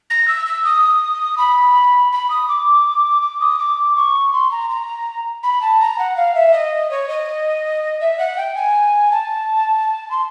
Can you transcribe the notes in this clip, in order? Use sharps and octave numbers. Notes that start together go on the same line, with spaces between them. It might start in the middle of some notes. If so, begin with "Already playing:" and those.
A#6
E6
E6
D#6
B5
B5
D#6
D6
D6
D#6
D6
C#6
C6
A#5
A#5
B5
A5
A#5
F#5
F5
E5
D#5
C#5
D#5
E5
F#5
G5
G#5
A5
C6